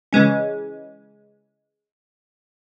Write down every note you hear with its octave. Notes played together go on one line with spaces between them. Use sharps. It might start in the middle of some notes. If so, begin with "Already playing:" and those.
C#3 E3 G#3 C#4